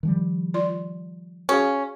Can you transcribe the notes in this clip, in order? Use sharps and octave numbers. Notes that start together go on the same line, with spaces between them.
D#3 F3 G3
F4 D5 C6
C#4 F#4 G#4 F5